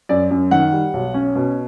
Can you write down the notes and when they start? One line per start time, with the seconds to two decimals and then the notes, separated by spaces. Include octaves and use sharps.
0.09 F#2 D5
0.31 F#2
0.51 D#3 F#5
0.72 G3
0.93 B1
1.14 C#4
1.35 B2